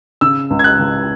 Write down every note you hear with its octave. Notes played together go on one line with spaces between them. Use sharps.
C#3 E6
C#2
G#6
F#6
C#2